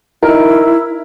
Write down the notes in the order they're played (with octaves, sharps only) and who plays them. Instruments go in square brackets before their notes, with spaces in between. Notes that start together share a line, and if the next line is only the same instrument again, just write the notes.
[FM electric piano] D#4 [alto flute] E4 [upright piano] A#4